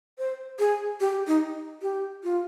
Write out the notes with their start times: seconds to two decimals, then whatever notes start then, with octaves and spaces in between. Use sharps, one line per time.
0.18 C5
0.59 G#4
1.00 G4
1.27 D#4
1.82 G4
2.24 F4